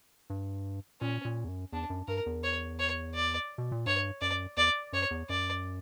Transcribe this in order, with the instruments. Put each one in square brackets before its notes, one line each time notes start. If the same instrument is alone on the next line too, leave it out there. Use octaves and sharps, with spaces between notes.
[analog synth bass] G2
[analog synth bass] A#2 [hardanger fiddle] C#4
[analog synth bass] A#2
E2
F#2
[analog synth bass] E2 [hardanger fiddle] D4
[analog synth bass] F#2
[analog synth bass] G2 [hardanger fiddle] A#4
[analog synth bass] E2
[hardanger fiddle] C#5
C#5
D5
[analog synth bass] B2
A#2
[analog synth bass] G2 [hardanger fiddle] C#5
[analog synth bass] F#2 [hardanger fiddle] D5
[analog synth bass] E2 [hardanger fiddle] D5
[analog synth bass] F#2 [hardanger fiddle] C#5
[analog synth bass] E2
[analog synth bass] F#2 [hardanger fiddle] D5